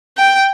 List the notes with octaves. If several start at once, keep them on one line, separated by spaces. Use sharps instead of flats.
G5